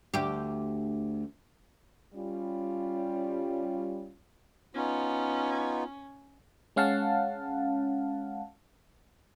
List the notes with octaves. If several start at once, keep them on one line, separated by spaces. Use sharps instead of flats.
D2 G4
G3 C#4 F4
B3 C#4 D#4 F4
G#3 C#4 F5 F#5 A5